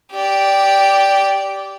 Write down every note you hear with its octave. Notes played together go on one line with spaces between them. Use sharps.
G4 D5